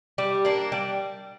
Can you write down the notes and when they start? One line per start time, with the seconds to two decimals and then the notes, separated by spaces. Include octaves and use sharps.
0.18 G3
0.45 A#3 D4
0.72 G3